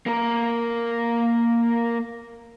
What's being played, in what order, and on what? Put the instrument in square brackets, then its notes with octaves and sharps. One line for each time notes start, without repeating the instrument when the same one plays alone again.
[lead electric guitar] A#3 A#4